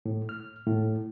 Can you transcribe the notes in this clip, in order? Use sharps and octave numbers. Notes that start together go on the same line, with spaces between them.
A2
F6
A2